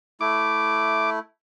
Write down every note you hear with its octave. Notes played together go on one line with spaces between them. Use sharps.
A3 E4 D6